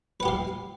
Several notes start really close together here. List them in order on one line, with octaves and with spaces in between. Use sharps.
B4 F#5 G4 F5